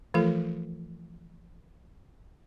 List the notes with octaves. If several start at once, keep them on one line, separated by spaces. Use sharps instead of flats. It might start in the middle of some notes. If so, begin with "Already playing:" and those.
E3 F3 A3 F4 A4